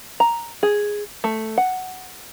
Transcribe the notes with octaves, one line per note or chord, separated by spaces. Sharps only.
A#5
G#4
A3
F#5